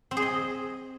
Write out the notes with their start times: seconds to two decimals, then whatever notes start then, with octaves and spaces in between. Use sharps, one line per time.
0.11 C4
0.17 G#4
0.22 D#5